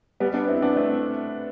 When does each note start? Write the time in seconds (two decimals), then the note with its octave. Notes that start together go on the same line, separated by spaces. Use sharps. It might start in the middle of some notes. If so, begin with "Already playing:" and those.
0.20 G3 B3
0.34 B3 D4
0.48 C4 E4
0.62 B3 D4
0.76 A3 C4